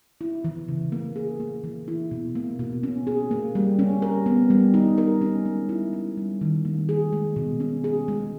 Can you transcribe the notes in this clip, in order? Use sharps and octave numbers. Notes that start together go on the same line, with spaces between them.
E4
E3
C#3
A#3
G#4
A#3
E3
E4
B2
A#3
B2
C#4
G#4
A#3
G3
C#4
A#4
B3
G3
D#4
A#4
C#4
G#3
E4
C#4
G3
D#3
A#3
G#4
G#3
B2
C#4
G#4
G#3